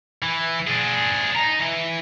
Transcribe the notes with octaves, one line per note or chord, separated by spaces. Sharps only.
E3
D4 G#4
D#5 A#5
E3